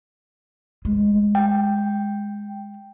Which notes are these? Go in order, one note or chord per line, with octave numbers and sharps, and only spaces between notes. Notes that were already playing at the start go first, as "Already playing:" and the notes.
G#3 A3
G5